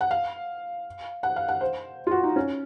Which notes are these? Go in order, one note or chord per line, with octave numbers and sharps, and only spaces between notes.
F#5
F5
F#5
F5
F#5
C5
F4
F#4
D#4
C#4